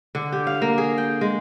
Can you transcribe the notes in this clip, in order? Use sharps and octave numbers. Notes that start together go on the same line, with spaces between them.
D3
G4
F5
A#3
G#4
G5
G#3